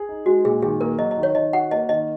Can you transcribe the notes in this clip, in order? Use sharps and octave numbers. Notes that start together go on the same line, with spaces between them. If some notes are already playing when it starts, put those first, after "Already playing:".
Already playing: G#4
D#4
G#3 F#4
A#2 G#4
D#3 G#4
A#3 A#4
F#3 D#5
D#5
D#3
C#5
D#3 D#5
F#4 F#5
A#3 D#5
D#3 D#5